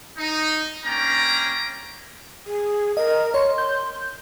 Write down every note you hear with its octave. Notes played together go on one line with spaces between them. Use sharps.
D#4
A#3 C#4 D4 G5 A#5
G#4
A#4 D#5
C#5 C6
G6